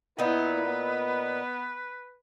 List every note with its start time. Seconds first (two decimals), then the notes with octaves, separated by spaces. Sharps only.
0.19 A#2 B3 D#4 E4 B4
0.65 B3